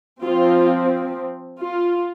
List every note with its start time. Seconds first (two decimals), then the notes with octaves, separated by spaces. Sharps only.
0.23 F3 C4 F4
1.60 F4